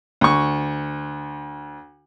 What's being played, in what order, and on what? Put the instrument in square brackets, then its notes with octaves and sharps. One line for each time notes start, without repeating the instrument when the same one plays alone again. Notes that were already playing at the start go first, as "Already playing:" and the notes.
[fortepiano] D2 C#6